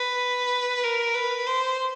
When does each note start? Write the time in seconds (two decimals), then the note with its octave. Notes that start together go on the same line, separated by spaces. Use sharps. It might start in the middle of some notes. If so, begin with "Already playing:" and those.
Already playing: B4
0.84 A#4
1.15 B4
1.47 C5